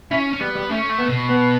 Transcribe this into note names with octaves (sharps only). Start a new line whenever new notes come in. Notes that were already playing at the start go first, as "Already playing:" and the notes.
C#4 E4
C#4
G3 B3
G3
A3 C#4
A3
B3
B2
B3